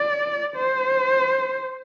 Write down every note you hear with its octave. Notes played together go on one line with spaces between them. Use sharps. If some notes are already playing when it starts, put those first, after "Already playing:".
Already playing: D5
C5